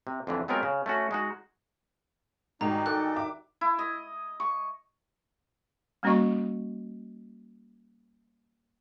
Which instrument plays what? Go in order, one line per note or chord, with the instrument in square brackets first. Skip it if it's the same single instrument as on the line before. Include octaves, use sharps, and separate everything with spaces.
[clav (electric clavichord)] C3
F2 D3 E3
F#3 G#3 B3 C4 F4 A#4
C#3
A3 C#4 F#4
G#3 D#4 F#4
[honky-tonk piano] G#2 [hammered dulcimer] D#3 G3 F#4 [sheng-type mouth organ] D4 D#4 [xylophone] A#5
[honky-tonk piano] A4 G#5 D6 [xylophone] F#6
[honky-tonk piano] E5 D6
[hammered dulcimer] E4
D#5
C#6
[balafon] G3 A#3 C#4 F#4 D#5 C#6